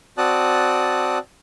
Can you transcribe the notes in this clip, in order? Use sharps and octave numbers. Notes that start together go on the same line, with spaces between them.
C4 F#4 D5 A5 D#6 F#6